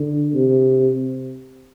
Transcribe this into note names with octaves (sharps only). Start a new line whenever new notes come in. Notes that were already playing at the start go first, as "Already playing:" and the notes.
Already playing: D3
C3